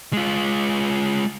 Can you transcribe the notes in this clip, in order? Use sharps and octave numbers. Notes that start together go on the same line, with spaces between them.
G#3 F4